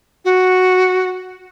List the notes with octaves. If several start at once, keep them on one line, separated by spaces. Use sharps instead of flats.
F#4